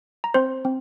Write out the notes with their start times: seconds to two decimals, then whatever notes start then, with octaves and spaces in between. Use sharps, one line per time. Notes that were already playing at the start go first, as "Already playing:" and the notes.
0.24 A#5
0.34 C4 C5 C6
0.65 C4